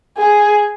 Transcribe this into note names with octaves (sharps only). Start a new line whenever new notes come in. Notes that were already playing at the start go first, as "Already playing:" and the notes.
G#4